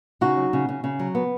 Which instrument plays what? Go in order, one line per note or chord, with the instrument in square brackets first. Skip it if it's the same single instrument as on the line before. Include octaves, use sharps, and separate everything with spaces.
[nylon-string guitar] C#3 D#4 F#4
F#3
C#3
C#3
C#3
F#3
B3